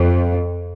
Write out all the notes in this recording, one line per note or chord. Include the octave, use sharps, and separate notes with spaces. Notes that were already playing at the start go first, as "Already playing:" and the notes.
Already playing: F2